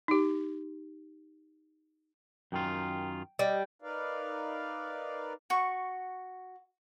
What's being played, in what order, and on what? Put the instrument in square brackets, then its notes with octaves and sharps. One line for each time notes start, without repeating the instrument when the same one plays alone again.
[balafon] D#4 G4
[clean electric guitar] F#2 D#3 F4 [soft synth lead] G5
[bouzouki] G3 [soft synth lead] D#5
[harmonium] D#4 A#4 B4 D5 F5
[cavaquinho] F#4 C#6